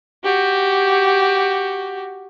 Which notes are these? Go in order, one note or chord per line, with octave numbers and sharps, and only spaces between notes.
F#4 G4